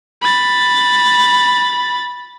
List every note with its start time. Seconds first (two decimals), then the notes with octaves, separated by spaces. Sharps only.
0.22 B5 A6